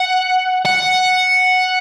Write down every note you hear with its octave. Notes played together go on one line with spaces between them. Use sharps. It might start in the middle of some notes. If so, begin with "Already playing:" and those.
Already playing: F#5
F#5